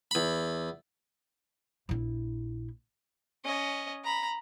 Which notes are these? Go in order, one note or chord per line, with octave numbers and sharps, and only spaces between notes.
E2 B5
A#1 E4
C#4 D#5
A#5 B5